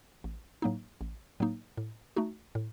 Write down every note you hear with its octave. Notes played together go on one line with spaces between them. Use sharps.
A1
A2 F#3 A#3 D#4
A1
A2 F#3 A#3 D#4
A2
A3 D#4 F#4
A2